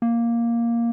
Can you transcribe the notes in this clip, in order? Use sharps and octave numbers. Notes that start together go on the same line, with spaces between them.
A#3